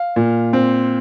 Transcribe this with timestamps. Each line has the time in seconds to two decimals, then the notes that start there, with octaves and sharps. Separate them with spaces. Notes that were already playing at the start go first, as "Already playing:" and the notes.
Already playing: F5
0.16 A#2
0.53 C4